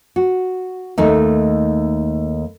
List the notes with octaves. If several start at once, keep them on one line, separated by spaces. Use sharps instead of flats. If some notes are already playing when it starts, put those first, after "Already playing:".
F#4
D#2 A3 D#4